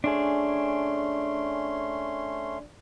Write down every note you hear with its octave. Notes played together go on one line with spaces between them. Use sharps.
A3 C#4 D4 G#4 C6